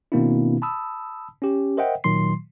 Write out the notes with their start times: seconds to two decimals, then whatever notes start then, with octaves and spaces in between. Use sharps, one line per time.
0.12 B2 D#3 A#3 C4 D4 E4
0.62 A5 B5 D#6 E6
1.42 C#4 G4
1.77 A#4 C5 D#5 E5 F#5 G5
2.04 A#2 D#3 F#3 C6 C7